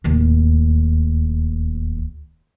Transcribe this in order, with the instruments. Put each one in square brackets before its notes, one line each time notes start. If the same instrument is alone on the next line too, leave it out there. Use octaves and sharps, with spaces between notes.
[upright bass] D1 D#2